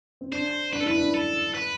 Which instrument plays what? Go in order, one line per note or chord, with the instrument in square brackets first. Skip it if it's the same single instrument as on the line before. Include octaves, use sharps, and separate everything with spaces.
[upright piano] C4
[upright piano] D4 [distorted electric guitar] C5
[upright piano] D4 [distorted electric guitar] B4
[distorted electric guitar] A4
[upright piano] E4 [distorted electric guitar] B4
[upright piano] D4
[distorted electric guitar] A4
B4